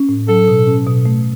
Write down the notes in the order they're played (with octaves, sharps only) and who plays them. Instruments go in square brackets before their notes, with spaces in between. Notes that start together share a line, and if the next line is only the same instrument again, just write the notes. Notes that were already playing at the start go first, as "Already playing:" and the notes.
Already playing: [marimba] C#4
A2
[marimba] F#3 [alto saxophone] A4
[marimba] B2
C#4
B2
A3